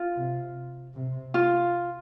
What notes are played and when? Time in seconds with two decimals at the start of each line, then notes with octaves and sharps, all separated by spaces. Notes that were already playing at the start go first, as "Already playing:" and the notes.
Already playing: F4
0.16 C3
0.94 C3
1.34 F4